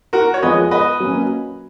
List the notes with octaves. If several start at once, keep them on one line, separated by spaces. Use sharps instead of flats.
F#4 A#4
C#5
F3 G#3 B3 B4 D#5
B4 D#5
F#3 A#3 C#4